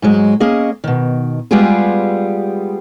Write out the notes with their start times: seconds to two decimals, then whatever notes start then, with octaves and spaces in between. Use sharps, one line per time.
0.02 G#2 F#3 G#3
0.40 A#3 C#4 G#4 D#5
0.84 B2 D#3
1.51 G3 G#3 B3 F4 G4 G#4